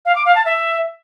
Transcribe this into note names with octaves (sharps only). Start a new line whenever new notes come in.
F5
D6
F5
A5
E5